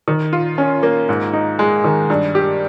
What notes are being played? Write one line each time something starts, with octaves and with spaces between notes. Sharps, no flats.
D#3
F4
C#4
A#3
G#2
D#4
G#3
D#3
G2
G4